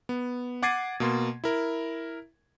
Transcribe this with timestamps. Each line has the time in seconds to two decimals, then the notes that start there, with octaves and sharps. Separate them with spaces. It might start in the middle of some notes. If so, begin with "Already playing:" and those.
0.09 B3
0.63 F#5 D6 G#6 A6 C7 D#7
1.00 B2 A#3 C6
1.44 E4 A#4